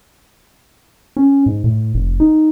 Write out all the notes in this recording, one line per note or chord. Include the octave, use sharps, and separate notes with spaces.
C#4
G#2
A2
F1
D#4